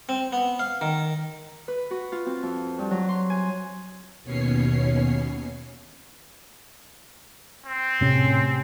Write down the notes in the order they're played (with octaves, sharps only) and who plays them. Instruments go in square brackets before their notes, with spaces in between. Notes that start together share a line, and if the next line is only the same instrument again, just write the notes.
[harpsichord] C4
B3
F5
D#3
[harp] B4
F#4
F4
C4
F2
G2
F#3
C6
G#5
[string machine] D#2 B2 C#4 C#5 C7
[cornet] C4
[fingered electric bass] A2 [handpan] C3 C#4